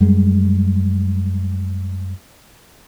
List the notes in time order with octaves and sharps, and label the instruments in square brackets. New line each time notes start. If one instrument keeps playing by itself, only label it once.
[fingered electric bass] F#2 G3 G#3